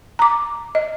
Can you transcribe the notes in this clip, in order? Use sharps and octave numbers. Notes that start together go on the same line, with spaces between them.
A#5 D6
D#5